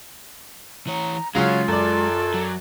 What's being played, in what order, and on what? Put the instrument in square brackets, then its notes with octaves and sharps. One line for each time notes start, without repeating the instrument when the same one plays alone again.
[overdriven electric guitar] E3 C#5 [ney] A#5
[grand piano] C#3 F#3 C#4 [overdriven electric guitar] G#3 [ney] F4 [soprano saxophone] F5
[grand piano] F#2 D5 [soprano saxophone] A4
[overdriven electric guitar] F#3